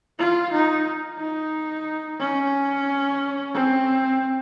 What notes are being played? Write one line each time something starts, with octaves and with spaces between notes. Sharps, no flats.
F4
D#4
D#4
C#4
C4